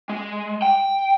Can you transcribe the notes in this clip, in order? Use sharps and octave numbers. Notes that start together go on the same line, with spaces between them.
G#3
G5